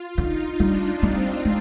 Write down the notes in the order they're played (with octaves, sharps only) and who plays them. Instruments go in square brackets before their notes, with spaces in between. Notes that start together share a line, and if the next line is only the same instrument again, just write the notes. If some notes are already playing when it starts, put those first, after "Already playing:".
Already playing: [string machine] F4
[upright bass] D3 [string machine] D#4
[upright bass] G3 [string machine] D4
[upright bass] G3 [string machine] C4
[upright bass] G#3